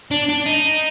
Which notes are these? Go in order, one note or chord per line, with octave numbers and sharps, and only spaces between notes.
D4
D4
D#4